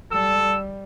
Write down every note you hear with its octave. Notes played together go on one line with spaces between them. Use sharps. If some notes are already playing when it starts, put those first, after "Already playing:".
G3 A4 E6